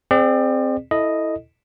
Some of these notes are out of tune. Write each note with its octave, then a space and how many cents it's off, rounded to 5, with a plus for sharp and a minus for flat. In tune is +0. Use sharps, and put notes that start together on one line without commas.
C4 +0 G#4 +0 D5 +35
E4 -10 A4 +0 D#5 +0